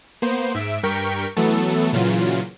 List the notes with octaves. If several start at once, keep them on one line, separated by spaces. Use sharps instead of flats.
A#3 B3 C5
G#2 E5 D7
G2 A#4 G5 C#6 B6
E3 F#3 A3 B3 A4
A#2 C#3 E3 F#3 F4